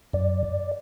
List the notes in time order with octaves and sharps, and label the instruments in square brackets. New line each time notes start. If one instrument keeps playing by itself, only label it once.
[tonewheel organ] F#2 D5